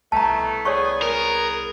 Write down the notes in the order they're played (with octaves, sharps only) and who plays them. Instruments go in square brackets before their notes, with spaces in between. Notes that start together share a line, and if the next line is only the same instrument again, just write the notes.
[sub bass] C2 [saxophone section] B2 A3 [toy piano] A5 A#5
[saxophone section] B3 G#4 [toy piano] C#5 D5 C#6
[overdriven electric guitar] A#4